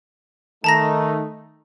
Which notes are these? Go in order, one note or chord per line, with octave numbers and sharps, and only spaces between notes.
D#3 A3 D#4 A5 A#5 A#6